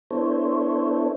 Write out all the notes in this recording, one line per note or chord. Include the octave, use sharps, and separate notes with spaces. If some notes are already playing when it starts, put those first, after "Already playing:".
B3 D4 E4 A4 C5 C#5